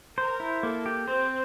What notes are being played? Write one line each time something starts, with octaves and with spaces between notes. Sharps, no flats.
A#4 C5
E4
A#3 A4
G4
C4 C5